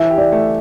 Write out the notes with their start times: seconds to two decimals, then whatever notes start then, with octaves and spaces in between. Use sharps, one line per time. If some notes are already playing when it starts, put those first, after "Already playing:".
Already playing: E3 E5
0.10 G4
0.18 D5
0.32 A3